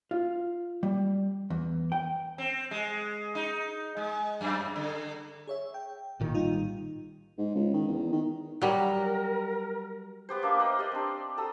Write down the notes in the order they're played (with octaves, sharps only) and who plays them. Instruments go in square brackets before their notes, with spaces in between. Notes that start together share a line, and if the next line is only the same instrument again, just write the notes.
[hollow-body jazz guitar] F4
G3
E2
G5
[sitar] C4
G#3
D#4
G#3
F#2
D3
[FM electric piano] G#4 C#5 E5
G5
[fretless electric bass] A1 A#2 D#3
[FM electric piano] G3 D#4 F4
[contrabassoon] G#2
C#2
D#3
E2
D#3
[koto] F#3 G3 [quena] A#4
[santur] B3 G4 C5
A#3 D4 A#4 E5
B4 C5 D#5 B5
G4 D5 D#5
C4 D4
A4 A#5 D#6 E6